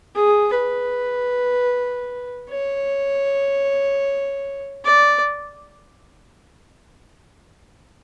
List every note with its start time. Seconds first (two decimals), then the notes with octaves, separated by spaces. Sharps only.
0.15 G#4
0.54 B4
2.50 C#5
4.85 D5